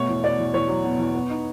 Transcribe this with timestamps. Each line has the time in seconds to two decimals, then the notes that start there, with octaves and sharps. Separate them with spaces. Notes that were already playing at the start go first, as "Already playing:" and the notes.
Already playing: B2 A3 C#5
0.09 E2
0.24 B2 D5
0.39 E2
0.54 E2 C#5
0.69 F#3
0.84 B2
1.00 E2
1.15 B3
1.30 D#4